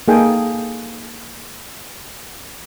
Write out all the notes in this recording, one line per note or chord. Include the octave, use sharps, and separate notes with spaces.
A#3 D#4 G#4 A4 G5 G#5